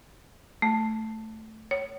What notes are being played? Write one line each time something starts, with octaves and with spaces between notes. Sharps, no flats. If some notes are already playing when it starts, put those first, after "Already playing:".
A3
C#5